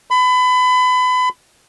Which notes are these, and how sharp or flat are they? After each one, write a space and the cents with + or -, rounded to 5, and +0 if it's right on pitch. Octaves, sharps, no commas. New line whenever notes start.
B5 +30